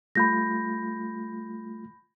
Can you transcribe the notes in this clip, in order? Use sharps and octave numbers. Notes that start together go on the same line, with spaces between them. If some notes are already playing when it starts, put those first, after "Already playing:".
G3 A3 F4 B5 G6 A#6